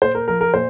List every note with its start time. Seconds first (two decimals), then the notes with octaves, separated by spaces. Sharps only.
0.02 A#2 C5
0.15 A#4
0.28 F3 A#4
0.41 A#4
0.54 A#2 C5